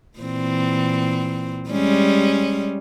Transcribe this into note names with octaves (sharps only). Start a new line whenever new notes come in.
A#2 E3 C4
G3 G#3 C#4